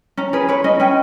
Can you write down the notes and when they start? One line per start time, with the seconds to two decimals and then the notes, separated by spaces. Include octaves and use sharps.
0.17 C#4 A#5
0.33 G#4 B4
0.49 B4 C#5
0.64 C#4 D#5
0.80 C#4 G5